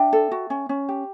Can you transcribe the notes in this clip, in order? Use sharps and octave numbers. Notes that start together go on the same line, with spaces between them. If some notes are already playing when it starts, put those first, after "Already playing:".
Already playing: D4 E5 G5
A4
F#4
C#4
C#4
G4